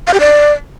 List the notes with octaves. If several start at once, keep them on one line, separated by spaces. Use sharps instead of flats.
F5
G4
D5